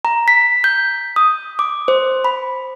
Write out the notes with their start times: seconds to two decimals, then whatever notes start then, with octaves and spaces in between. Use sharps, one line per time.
0.05 A#5
0.28 B6
0.64 G6
1.16 D#6
1.59 D6
1.88 C5
2.25 B5